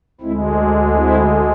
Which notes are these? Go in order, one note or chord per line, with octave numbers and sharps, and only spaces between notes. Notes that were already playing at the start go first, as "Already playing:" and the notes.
D2 D3 G#3 C4 E4
D4
C4 E4